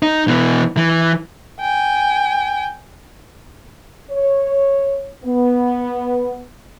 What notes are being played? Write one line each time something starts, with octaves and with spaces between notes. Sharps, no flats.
D#4
B2 E3
E3
G5 G#5
C#5
B3